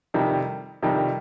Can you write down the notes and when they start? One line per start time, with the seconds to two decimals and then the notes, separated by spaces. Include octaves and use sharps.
0.14 F2 C3 D#3 G3
0.82 F2 C3 D#3 G3